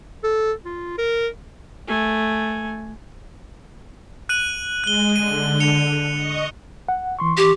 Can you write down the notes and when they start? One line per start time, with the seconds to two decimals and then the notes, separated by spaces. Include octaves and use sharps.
0.24 A4
0.65 F4
0.98 A#4
1.87 A3 G#5
4.29 F#6 D#7 F#7
4.84 G#3 F#6 G7
5.16 D3 D#7
5.60 C#7 F7
6.16 D#5 C#6
6.89 F#5
7.19 E3 C6 C#6
7.37 G4